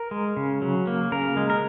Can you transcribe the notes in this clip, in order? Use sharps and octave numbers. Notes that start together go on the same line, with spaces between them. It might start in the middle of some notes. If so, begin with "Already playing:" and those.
Already playing: A#4
G#3
C#3
F#3
A#3
C#3 A#4
G#3
A#4